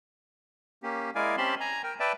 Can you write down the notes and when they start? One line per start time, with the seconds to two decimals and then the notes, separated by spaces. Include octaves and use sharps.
0.83 A#3 C#4 G4
1.15 G#3 E4 A#4 D5 F5 G#5
1.37 C4 C#4 G4 A5 B5 C6
1.60 G#5 A#5
1.84 A#4 G5
2.00 B4 D5 E5 G5 A5